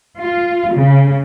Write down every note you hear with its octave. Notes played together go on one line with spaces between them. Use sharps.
F4
C#3